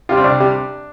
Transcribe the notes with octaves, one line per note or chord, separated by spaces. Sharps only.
C3 G3 F4
C4
C2 D4
C3 G3